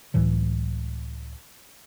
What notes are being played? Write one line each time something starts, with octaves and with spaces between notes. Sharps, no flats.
C#2 A2 E3 F#3